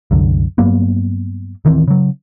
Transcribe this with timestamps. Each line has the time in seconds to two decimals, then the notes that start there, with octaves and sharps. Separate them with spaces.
0.11 C2 F#2 D3
0.58 G2 F#3 A#3 B3
1.65 D1 D#3 E3 C4
1.88 C#3 F#3